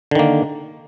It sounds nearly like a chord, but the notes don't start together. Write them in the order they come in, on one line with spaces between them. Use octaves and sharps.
D3 D#3 A#3